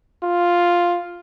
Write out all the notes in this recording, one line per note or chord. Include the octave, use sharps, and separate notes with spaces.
F4